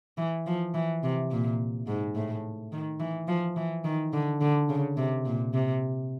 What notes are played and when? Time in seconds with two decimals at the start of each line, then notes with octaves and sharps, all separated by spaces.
0.17 E3
0.46 F3
0.74 E3
1.03 C3
1.31 A#2
1.87 G#2
2.15 A2
2.72 D#3
3.00 E3
3.28 F3
3.56 E3
3.84 D#3
4.13 D3
4.41 D3
4.69 C#3
4.97 C3
5.25 A#2
5.53 C3